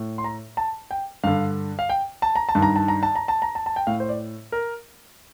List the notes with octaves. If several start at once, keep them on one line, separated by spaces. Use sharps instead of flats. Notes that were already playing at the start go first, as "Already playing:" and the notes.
Already playing: A2
C6
A#5
A5
G5
G2 D3 F5
F5
G5
A5
A#5
A5
G2 D#3
A#5
A5
A#5
A5
A#5
A5
A#5
A5
A5
G5
A2 F5
C5
D5
A#4